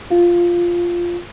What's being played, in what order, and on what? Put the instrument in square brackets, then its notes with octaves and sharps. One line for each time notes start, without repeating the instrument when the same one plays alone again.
[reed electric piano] F4